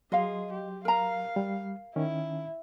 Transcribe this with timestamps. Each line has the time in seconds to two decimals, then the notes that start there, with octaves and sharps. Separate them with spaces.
0.12 F#3 G#4 D#5 F5 C6
0.53 G4
0.85 A#4 F5 A#5
1.36 G3
1.96 D#3 C#4 E4